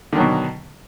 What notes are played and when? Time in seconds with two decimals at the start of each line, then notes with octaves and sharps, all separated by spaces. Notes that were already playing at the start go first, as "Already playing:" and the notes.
0.13 D3
0.15 D#3
0.18 F#3
0.20 B2